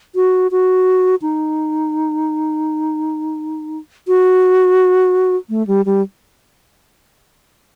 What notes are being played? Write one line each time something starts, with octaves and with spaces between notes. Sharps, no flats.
F#4
F#4
D#4
F#4
A3
G3
G3